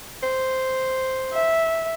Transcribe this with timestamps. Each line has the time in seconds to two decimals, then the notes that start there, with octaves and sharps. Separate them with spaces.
0.23 C5
1.33 E5